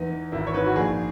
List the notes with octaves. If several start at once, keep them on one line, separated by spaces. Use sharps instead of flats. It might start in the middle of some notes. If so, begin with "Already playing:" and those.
Already playing: E2 E3 D#4
E3
G#1 E4
C#5
G#2 B4
F#4
A#1 G#4